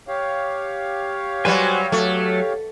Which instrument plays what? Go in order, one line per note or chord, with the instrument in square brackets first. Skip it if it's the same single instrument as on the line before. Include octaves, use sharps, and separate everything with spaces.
[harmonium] G4 C#5 F5
[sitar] F#3 G3 B4 [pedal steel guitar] F#4 C5 G#5
[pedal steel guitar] F#3 [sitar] A3